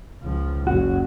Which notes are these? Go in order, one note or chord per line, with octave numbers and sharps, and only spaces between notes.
C#2 F3
F#1 F#2 F#4